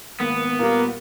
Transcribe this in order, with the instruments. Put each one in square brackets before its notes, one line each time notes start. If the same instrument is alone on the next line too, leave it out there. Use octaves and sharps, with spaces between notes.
[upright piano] G#1 A#3 [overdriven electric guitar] B3
[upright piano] A#2 G3 [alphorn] A#3